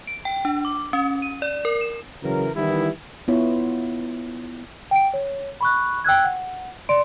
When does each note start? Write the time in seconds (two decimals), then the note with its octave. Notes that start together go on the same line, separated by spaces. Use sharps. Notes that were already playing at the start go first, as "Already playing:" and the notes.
0.07 D7
0.25 G5
0.45 D4
0.65 D6
0.93 C#4
1.22 D#7
1.42 D5
1.65 A#4
1.81 E7
2.22 C#3 E3 F#3 A#4
2.56 D#3 E3 G3 B3 E4
3.28 B3 E4 F4 C#5
4.91 G5 D7
5.14 C#5
5.61 B5 C#6 F#6
6.04 G5 E6 F#6 G#6
6.24 F#5
6.89 D5 C6 D7